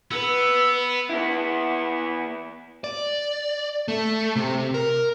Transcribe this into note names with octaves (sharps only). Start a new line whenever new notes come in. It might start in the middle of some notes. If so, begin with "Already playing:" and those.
B3 B4 E6
B3 E4
D5
A3
C3
A#4